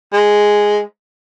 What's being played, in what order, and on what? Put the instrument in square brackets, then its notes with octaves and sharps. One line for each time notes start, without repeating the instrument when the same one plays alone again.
[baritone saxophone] G#3